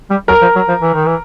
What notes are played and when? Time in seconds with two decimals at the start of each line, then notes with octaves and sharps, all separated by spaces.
0.10 G3
0.28 F#3 A#4
0.42 F3
0.55 F#3
0.68 F3
0.82 E3
0.94 D#3
1.06 E3